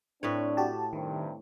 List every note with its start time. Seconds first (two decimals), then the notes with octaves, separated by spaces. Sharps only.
0.23 A2 C4 D4 B4 C#5
0.57 F#4 G4 A5
0.93 G2 C3 D#3